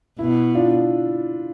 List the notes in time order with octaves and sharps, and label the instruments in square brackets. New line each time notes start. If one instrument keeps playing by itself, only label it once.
[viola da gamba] B2 [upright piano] E4
[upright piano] D4 F4